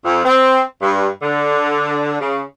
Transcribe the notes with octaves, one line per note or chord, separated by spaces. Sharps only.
F2
C4
G2
D3
C#3